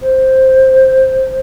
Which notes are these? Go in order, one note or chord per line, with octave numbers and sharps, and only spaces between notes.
C5